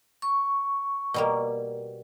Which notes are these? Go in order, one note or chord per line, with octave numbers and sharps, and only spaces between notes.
C#6
B2 G3 A#3